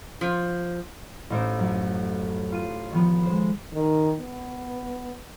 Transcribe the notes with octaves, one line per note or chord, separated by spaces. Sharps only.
F3
A1 D#4 C5 E5 D7
F#2
F4 C6 D#7
D#3 F3 B3
G#3 C5
D#3
B3